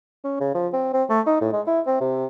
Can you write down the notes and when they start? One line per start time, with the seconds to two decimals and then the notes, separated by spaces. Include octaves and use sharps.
0.24 C#4
0.40 C#3
0.55 F3
0.73 C4
0.94 C4
1.10 A3
1.27 D#4
1.42 A2
1.53 G#3
1.67 E4
1.87 C4
2.01 C3